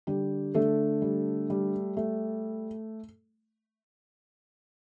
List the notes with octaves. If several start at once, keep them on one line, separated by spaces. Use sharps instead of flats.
D3 G3 G4
D3 A3 A4
G3
G3
A3